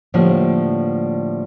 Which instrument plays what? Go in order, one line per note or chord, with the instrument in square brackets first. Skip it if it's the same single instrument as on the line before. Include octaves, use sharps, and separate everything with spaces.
[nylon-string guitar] A2 D3 F3 G3 A#3